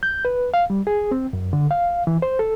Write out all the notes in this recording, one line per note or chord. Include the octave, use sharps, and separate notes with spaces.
G6
B4
F5
G3
G#4
C4
F#2
D3
F5
E3
C5
A4